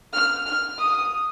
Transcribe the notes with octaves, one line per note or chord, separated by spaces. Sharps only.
F6
F6
D#6